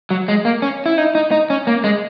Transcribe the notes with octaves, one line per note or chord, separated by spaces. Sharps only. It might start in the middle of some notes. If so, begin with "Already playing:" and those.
F#3
G#3
A#3
C#4
E4
D#4
D#4
D#4
C#4
A#3
G#3